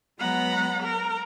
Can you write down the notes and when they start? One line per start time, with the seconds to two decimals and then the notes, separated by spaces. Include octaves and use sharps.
0.18 F#3 G#3 B3 F#5 A#5 B5
0.81 A#4